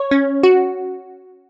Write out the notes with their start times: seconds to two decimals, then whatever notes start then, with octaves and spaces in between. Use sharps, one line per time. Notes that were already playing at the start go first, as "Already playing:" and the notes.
Already playing: C#5
0.11 C#4
0.43 F#4